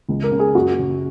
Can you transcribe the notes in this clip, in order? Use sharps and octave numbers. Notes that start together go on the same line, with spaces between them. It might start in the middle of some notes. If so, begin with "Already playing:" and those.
C#2
A#4
C#3
G#4
F#2 F#4
C#3